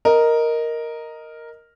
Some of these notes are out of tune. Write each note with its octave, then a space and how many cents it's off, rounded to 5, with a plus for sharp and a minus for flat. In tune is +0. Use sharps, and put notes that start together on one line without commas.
A#4 +0 D#5 +0